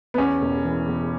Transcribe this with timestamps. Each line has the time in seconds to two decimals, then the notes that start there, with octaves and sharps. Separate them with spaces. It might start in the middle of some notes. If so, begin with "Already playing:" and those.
0.14 B3
0.18 E2 C#4
0.41 E1
0.65 E3
0.88 E1